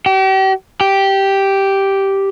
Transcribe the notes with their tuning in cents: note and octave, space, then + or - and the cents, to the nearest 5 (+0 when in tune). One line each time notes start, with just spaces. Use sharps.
G4 -40
G4 -5